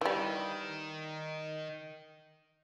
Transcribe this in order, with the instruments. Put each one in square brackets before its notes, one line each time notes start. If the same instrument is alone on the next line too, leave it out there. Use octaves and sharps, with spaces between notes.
[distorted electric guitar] D#3 [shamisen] E3 G3